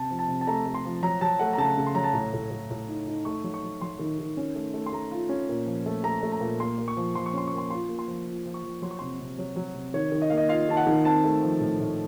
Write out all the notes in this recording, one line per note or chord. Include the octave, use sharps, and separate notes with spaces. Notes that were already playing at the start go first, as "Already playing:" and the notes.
Already playing: C3 A5
F3
A5
C3
A5
A3 A#5
A3
C6
F3
F#3 A#5
F#3 A5
A3 F#5
A#5
C#3 A5
C#3
C6
F#3 A#5
A5
A2 A#5
A2
A2
A2
D#4
D#4
A3 C#6
F#3
C#6
F#3
F#3 C6
D#3
D#3
C#4
A3
A3
C6
A3 A#5
F4
C#4
A#2
F3
A3
A3 A#5
A3
A#5
A#2
A#3 C6
A#3
C#6
F3
F3 C6
C#6
C#4 C6
C#6
A#3
C6
F4 C6
A#3
C6
F3
F4
F3
C#6
F3
F#3 C6
C#6
C3 C6
C3
F#3
F#3
C3
D#3 C#5
D#3
D#5
A#3 F5
D#5
F4 F5
D#3 A5
F#5
D#3
C4 A5
A3
F3
A2
A2